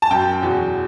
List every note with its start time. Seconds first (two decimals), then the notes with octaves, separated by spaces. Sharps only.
0.02 A5
0.11 F#2 F#3 G5
0.41 E2 B2 F#3